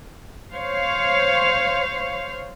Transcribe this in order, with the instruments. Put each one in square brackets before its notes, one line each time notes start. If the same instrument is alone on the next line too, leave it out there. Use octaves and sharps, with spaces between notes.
[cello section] C5 C#5 F5